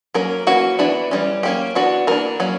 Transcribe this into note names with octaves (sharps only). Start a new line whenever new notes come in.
F#3 A#3 C#4 A#4
E3 A#3 C#4 F#4
E3 B3 D4 E4
E3 G3 C#4
F#3 A#3 C#4 G4
E3 B3 D4 F#4
E3 A#3 D4 A#4
F#3 A#3 C#4